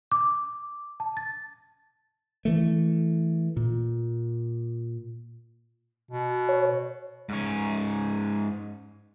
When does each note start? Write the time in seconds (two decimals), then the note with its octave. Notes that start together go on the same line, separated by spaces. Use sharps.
0.11 D6
1.00 A5
1.17 A6
2.45 E3 A3
3.57 A#2
6.11 B2
6.49 C#5
7.29 G#2 C#4